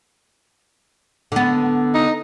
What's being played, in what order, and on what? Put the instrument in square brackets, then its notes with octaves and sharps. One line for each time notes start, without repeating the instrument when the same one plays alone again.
[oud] D3 B3
[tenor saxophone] D#4